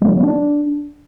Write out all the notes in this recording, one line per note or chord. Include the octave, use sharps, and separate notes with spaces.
G3
F#3
B3
D4